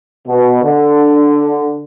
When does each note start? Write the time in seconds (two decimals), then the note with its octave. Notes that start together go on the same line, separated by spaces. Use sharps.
0.28 B2
0.63 D3